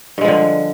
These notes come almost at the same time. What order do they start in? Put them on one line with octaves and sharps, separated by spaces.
G2 G#3 F3 D3